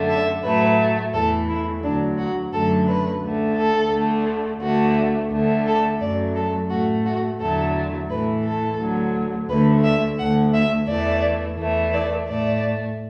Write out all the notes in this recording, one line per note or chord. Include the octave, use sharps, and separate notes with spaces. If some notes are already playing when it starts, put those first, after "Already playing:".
Already playing: F#2 D3 A3
E5
A2 F#3 A3 B4
E2 E3 A3 A4
E4
D2 D3 F#3 D4
F#4
F#2 D3 F#3 A3 A4
B4
D2 D3 A3
A4
D2 D3 A3
D2 D3 A3 F#4
D2 D3 A3
A4
F#2 F#3 A3 D5
A4
A2 A3 F#4
F#4
E2 D3 F#3 A3 A4
A2 E3 A3 B4
A4
D2 D3 F#3
D2 D3 A3 B4
E5
D2 D3 A3 F#5
E5
E2 E3 A3 D5
E2 E3 A3
D5
A2 A3 D5